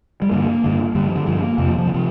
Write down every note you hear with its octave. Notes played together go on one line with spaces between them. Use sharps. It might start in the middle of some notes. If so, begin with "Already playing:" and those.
G3
G2 D3 A#3
G2 D3
G2 D3 G3
F3
D3
G2 D3 F3
A#3
F2 C3
F3
F3
D3
C3 F3